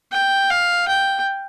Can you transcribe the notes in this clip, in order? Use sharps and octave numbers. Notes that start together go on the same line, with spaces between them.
G5
F5
G5